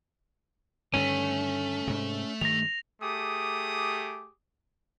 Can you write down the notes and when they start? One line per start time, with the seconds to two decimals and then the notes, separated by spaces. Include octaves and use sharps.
0.94 G2 D3 D#3 A3 C#4
1.87 G#2 C3
2.41 G2 D#3 A#6 F7
3.02 A3 G4 G#4 D6 D#6